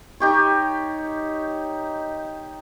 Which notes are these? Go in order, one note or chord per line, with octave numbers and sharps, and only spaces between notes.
D#4 G4 C#5